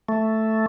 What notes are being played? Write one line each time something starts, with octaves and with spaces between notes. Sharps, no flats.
A3